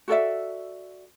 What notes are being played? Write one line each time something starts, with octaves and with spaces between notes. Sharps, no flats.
F#4 A4 D5 E5